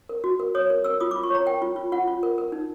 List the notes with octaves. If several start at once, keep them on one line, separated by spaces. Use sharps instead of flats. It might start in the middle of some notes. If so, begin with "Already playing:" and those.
A#4
F#4
A#4
C#5 D#6
A#4
A#4 E6
F4 D#6
F4 D6
C#6
C#5 A#5
A#4 G5
F4
F4
F4 F#5
F4
A#4
A#4
D#4